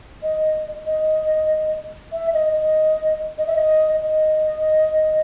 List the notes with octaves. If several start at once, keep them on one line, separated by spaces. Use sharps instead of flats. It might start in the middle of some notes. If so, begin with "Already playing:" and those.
D#5
D#5
E5
D#5
D#5
D#5
E5
D#5
D#5